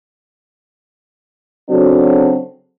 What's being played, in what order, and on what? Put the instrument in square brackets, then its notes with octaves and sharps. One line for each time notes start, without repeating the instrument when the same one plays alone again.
[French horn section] C#3 F#3 C4 D4 F#4 A4